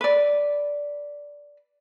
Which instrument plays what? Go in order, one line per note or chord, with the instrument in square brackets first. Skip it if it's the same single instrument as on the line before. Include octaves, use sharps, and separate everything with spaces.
[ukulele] B4 D5